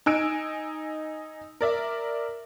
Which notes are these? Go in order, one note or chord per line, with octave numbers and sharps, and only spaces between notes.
D#4 G#5 E6 D7
A#4 D5 E5